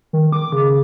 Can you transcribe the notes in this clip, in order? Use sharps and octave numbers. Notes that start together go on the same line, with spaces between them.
D#3
D6
C#3